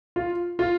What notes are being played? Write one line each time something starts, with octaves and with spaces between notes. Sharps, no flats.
F4
F4